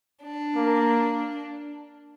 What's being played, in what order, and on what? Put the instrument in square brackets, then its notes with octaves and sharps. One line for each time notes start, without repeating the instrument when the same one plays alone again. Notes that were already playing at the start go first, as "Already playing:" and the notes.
[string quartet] D4
[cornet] A#3